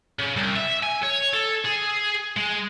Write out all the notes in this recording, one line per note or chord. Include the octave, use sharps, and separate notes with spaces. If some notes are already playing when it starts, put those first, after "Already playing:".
C#3
C2
E5
G#5
C#5
A4
G#4
G#3